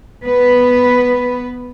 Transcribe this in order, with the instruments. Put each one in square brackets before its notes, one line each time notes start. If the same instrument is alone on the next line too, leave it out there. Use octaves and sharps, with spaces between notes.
[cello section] B3 B4